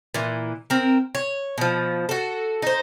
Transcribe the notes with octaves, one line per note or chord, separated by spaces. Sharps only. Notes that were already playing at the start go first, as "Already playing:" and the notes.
A#2 E3
C4 A#4
C#5
B2 F3
F#4 A4
D#4 C5